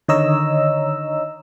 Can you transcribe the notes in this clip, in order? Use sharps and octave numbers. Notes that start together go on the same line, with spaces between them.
D3 D#3 C#5 D#5 A#5 E6